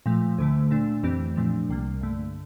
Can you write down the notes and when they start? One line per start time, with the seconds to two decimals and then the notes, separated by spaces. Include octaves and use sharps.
0.06 A#2 F3 A3
0.38 D2 D3 A3
0.70 A#2 A3 D4
1.03 F2 E3 A3 C4 G4
1.36 A#2 F3 A3 D4
1.68 C2 C3 G3 A#3
2.01 G2 D3 A3